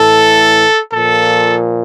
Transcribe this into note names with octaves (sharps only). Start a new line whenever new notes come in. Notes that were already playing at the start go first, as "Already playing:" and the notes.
Already playing: A2 E3 A4
A#2 F3 A4